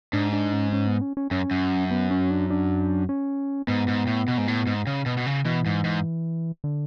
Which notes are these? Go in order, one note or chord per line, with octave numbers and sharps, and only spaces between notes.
G#2 D4
D4
C#4
C#4
B3
C#4
C#4
F#2 C#4
F#2
B3
C#4
D4
D4
C#4
G#2 B3
G#2
A2
B2
G#2
A2
G#2
C#3
B2
B2
C#3
B2 E3
G#2
G#2
D3